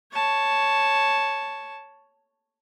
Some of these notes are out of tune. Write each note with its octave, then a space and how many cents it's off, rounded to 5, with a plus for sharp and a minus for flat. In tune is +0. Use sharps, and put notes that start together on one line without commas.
C#5 +0 A5 +0